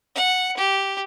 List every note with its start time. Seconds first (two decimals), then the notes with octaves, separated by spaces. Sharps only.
0.15 F#5
0.57 G4